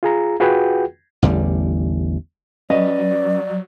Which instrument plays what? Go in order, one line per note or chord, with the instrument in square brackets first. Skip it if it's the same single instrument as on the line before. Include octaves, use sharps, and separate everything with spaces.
[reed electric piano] F4 G#4 A#5
F4 F#4 G#4 B4 F#5 G5
[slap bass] A1 E2 D3 G3
[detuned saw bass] F#3 [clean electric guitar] C#4 B4 [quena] D5 [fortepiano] D#5